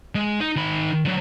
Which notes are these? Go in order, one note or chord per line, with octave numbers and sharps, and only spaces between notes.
G#3
D#4 D#5
D#3 B5
D3 F#3